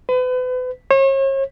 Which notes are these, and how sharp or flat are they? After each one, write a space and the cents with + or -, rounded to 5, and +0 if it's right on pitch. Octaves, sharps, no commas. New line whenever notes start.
B4 +40
C#5 -40